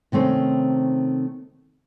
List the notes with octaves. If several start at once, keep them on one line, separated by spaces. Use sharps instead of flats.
C3 D#3 A3 C4 C#4